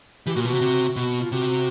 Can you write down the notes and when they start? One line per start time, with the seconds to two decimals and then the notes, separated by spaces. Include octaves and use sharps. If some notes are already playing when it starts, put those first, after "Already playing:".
0.27 E3 G4
0.34 A#2 F#4
0.42 F4
0.45 B2
0.48 C3 F#4
0.61 C3
0.96 B2 F#4
1.21 F4
1.32 C3 F#4